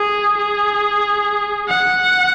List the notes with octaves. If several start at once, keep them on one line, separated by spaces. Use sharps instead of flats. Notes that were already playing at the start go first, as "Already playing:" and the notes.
Already playing: G#4
G#4
F#5